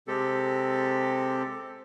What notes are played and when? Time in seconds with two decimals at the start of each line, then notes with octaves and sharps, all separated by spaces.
0.08 C3 G#3 C4 G4 A4